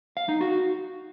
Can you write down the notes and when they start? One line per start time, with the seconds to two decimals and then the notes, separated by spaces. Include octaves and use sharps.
0.17 F5
0.29 D#4
0.41 F#4